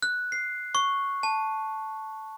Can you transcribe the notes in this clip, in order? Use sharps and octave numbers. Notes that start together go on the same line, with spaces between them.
F#6
C7
C#6
A5